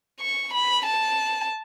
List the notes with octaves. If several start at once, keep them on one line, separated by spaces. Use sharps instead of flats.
C#6
B5
A5